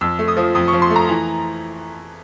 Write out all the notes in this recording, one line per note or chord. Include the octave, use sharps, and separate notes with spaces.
F2 E6
A3
D#6
F3
F2 D#6
C#6
F3
C6
A3
A#5
E3